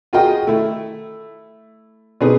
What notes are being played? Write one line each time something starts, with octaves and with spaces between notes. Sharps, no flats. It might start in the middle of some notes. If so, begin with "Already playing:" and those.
F4 F#4 G#4 A#4 D#5 G5
A3 E4
B2 D3 C4 D#4 G#4 B4